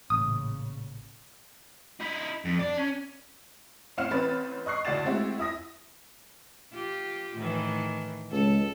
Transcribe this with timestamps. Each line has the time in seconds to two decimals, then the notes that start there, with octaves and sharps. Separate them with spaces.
0.10 A1 A#2 C#3 D#6
2.00 D#4 E4
2.45 F2
2.59 D5 A5
2.77 C#4
3.97 A2 C4 F5 F#5 F6 E7
4.11 A1 C4 B4 B5 A6
4.66 D#5 C#6 F#6 C7
4.85 D2 A2 F#4 D5 A6 E7
5.05 G#3 A3 C4 E4 F#4 G4
5.38 E4 E5 D#6 A#6
6.73 F4 G4
7.36 A2 D#3 E3
8.31 C#2 A4